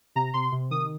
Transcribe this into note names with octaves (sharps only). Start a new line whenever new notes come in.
C3 A#5
C3 C6
C3
D#3 D#6